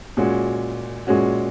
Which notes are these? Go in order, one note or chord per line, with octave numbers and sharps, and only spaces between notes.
A#2 G#3 C#4 F#4
A#2 G#3 C#4 F#4